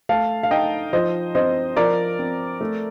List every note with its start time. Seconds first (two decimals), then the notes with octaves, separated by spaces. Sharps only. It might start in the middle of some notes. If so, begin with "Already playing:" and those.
0.09 A3 F5 A5
0.43 F5
0.51 D#4 D#5 G5
0.93 F3 C5 D#5
1.35 C4 C5 D#5
1.77 F3 A#4 D5
2.19 C4
2.61 A3